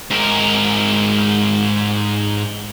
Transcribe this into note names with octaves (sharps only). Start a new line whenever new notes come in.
G#2 A#4